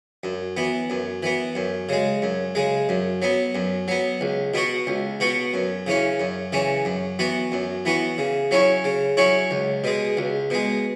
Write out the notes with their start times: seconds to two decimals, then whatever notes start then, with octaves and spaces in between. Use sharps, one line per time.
0.24 F#2
0.57 E3 B3
0.90 F#2
1.23 E3 B3
1.55 F#2
1.89 C#3 G#3
2.22 F#2
2.55 C#3 G#3
2.89 F#2
3.22 F#3 B3
3.55 F#2
3.88 F#3 B3
4.21 C#2
4.54 B2 B3 F#4
4.87 C#2
5.20 B2 B3 F#4
5.54 F#2
5.87 C#3 E3 C#4
6.19 F#2
6.53 C#3 E3 C#4
6.85 F#2
7.19 E3 B3 F#4
7.52 F#2
7.85 E3 B3 F#4
8.18 C#3
8.51 F#3 C#4 E4 C#5
8.84 C#3
9.17 F#3 C#4 E4 C#5
9.51 C#2
9.84 B2 G#3
10.17 C#2
10.50 B2 G#3